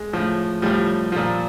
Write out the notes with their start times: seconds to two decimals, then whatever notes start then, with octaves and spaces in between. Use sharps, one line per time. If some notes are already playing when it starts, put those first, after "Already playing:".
Already playing: G#3
0.13 A2 F3
0.62 A2 F3 G3
1.12 A#2 F3